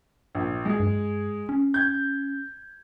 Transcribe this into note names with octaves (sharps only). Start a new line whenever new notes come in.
A#1
G#3 G#4
G2
C#4
G6 G#6